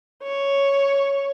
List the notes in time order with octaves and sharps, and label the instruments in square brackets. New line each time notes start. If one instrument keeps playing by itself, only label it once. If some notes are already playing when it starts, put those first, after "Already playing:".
[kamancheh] C#5